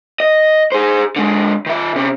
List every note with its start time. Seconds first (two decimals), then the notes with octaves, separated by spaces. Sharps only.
0.20 D#5
0.72 G#4 C5
1.16 D3 G#3
1.66 D#3 E5
1.96 C3 C#4